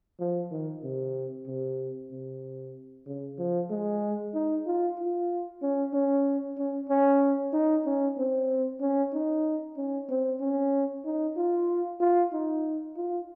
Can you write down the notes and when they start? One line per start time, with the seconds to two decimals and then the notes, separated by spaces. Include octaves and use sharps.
0.19 F3
0.51 D#3
0.83 C3
1.47 C3
2.11 C3
3.06 C#3
3.38 F3
3.70 G#3
4.34 D#4
4.66 F4
4.98 F4
5.62 C#4
5.93 C#4
6.58 C#4
6.89 C#4
7.53 D#4
7.85 C#4
8.17 C4
8.80 C#4
9.13 D#4
9.76 C#4
10.09 C4
10.40 C#4
11.05 D#4
11.37 F4
12.00 F4
12.32 D#4
12.96 F4